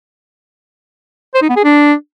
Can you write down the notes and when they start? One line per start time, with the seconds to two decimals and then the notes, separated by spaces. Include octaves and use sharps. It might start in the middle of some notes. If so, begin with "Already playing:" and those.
1.34 C5
1.42 D#4
1.49 B3
1.56 G#4
1.64 D4